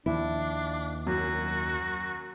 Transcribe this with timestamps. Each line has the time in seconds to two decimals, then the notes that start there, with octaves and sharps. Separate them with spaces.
0.06 D#2 F3 D4 E4
1.07 F#2 F#4